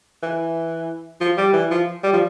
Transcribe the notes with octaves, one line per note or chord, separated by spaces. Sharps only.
E3
F3
G3
E3
F3
G3
F3